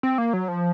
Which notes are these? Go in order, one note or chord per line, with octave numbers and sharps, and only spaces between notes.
C4
A#3
F#3
F3